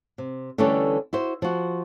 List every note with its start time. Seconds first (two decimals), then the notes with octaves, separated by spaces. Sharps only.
0.18 C3
0.58 D3 E3 G3 A3 C#4 A4
1.13 E4 F#4 C5
1.42 F3 F#4